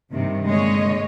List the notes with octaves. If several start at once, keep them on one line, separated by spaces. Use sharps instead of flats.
G2 C3 D#3
G2 D3 G#3 A#3 C#5 D#5